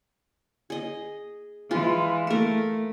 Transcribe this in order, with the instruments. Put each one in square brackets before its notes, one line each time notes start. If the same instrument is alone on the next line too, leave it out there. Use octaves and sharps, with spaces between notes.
[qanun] G#4 D#5
[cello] E3 [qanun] G#3 F4
[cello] A3 [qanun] A4 A#4